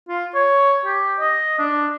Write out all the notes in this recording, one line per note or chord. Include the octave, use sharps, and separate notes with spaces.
F4
C#5
G4
D#5
D4